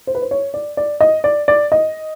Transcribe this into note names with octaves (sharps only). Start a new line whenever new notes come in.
C5
B4
C5
C#5
D5
D5
D#5
D5
D5
D#5